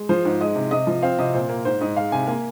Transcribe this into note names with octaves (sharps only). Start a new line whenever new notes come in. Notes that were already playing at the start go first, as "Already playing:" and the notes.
Already playing: G#3
F3 C5
G#2
G#3 D#5
C3
C3 D#5
F3
C4 F5
C3 D#5
A#2 C5
A#3
G#2 C5
G#2 D#5
G#3 F5
C3 G#5
A#3 G#5